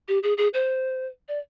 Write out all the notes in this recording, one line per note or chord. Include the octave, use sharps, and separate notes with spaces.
G4
G#4
G#4
C5
D5